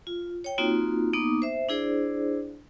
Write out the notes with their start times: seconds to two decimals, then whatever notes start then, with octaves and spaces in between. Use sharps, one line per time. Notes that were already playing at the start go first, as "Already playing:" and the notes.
0.07 F4
0.44 C#5 G5
0.58 A#3 C4 D#4 F4 F#4
1.13 A#3 B3 D#4 D6 D#6
1.42 C5 E5
1.69 D4 E4 G#4 C5 D5